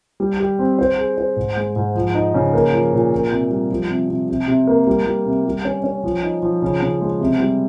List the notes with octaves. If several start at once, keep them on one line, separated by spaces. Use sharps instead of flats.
G3
G4
C4
C5
G#4
C5
G#2
G#3
G#2
F3
D#4
C#3
A#3
F3
A#2
A#3
C3
G3
F3
C3
C3
C3
C3
A#3
G3
G3
C3
G3
C#4
C#4
F3
D#4
F3
C#3
C#3
G#3
C3
G3